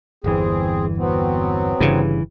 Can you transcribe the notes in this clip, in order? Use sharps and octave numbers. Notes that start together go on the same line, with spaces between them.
G1 E2 E3 C4 G#4
F#3 B3 C4
G1 G2 C#3 E3